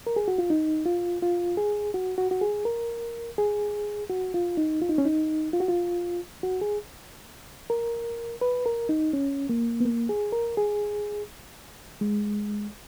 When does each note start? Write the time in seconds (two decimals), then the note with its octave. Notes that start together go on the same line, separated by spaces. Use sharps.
0.07 A#4
0.16 G#4
0.28 F#4
0.38 F4
0.50 D#4
0.85 F4
1.22 F4
1.57 G#4
1.94 F#4
2.18 F#4
2.31 F#4
2.41 G#4
2.65 A#4
3.38 G#4
4.10 F#4
4.34 F4
4.57 D#4
4.82 F4
4.89 D#4
4.98 C#4
5.05 D#4
5.53 F4
5.60 F#4
5.68 F4
6.43 F#4
6.61 G#4
7.70 A#4
8.41 B4
8.66 A#4
8.89 D#4
9.13 C#4
9.49 A#3
9.80 B3
9.85 A#3
10.09 G#4
10.32 A#4
10.57 G#4
12.01 G#3